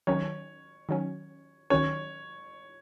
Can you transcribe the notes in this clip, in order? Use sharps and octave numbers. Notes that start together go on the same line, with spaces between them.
D#3 F#3 C#4 C#5
D#3 F#3 C#4
D#3 F#3 C#4 C#5